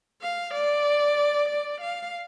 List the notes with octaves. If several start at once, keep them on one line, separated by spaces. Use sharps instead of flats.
F5
D5
D5
F5